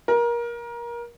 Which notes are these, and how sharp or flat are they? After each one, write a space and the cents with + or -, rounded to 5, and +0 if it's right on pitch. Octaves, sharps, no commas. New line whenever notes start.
A#4 +25